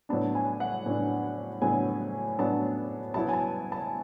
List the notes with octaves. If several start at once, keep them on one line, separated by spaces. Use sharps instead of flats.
A2 F#3 B3 D4 A5
G#5
F#5
A2 F#3 B3 D4
A2 F#3 B3 D4 G#5
A2 F#3 B3 D4 A5
B2 F#3 B3 E4 A5
G#5
A5
A5